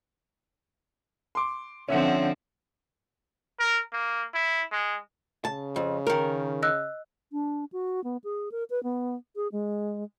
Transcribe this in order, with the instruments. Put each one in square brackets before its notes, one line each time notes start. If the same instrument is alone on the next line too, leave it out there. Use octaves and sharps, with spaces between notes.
[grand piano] C6 D6
[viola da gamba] D3 F3 C4 [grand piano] C#4 E5 F#5
[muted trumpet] A#4
A#3
E4
G#3
[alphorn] C#3 [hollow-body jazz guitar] A5
[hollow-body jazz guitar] F2
D#3 A#4
[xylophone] D#5 E6 F#6
[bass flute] D4
F#4
B3
G#4
A#4
B4
B3
G#4
G#3